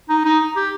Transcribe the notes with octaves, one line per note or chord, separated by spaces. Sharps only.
D#4
D#4
G4